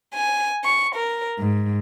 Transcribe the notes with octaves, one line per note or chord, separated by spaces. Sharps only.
G#5
C#6
A#4
G#2